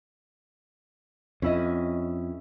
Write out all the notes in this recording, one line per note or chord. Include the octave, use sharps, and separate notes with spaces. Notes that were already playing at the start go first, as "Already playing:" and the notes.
F2 C#4 E4 D#5